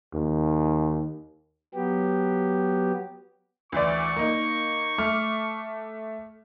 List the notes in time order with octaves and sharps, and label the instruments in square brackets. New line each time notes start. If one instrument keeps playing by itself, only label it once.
[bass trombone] D#2
[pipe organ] F#3 B3 G4
[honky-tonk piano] D2 E3 D5 [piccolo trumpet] C#6
[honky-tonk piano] A#3 D#4
A3 D6 F6